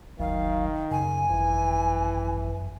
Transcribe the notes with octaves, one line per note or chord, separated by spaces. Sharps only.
F#1 D2 D#3 F#3 F5
F#2 C#3 G#5
G#1 E3